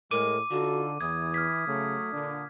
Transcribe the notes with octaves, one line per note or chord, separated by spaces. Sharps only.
A2 G#3 A#4 D6 D#7
D3 D#4 F4 F#4 A4
E2 E3 D#6 G#6
F6 G#6 B6
C#3 F#3 A3
A#2 D3 D4